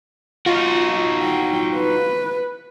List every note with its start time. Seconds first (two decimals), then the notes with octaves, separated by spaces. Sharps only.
0.46 D#4 F4 F#4
1.23 G5
1.76 B4